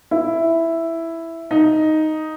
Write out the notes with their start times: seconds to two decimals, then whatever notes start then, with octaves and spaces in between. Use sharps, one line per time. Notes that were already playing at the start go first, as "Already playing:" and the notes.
0.11 E4
1.51 D#4